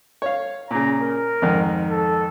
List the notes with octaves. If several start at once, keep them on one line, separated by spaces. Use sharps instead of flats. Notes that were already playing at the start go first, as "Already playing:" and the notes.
C#5 F5
A#2 C#3 A#5
A#4
F2 G#2 D#3
A4